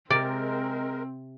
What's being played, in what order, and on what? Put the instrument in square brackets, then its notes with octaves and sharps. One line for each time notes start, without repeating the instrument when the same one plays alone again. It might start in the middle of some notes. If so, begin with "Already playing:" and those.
[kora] C3 [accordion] G#3 A#4 [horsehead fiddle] C4 [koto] D5